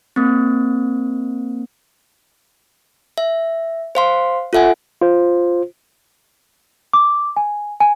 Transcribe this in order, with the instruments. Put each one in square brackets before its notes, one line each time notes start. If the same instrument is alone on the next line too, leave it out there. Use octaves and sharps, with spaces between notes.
[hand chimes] A#3 C4
E5
C5 F5 C6
F4 A4 E5 F#5 G#5
[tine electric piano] F4 C5
[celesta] D6
G#5
G#5